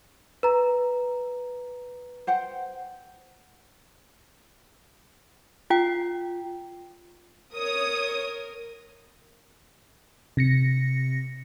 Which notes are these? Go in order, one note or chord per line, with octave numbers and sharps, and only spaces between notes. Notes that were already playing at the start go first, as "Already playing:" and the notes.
B4 A#5
C5 F#5 G5
F4 G5
A#4 C#5 D#6
C3 A#6 C#7